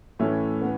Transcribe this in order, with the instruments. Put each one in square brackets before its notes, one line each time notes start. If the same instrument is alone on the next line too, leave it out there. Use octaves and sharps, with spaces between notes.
[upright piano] A2 E3 C#4 E4 [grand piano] A3
[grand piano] B3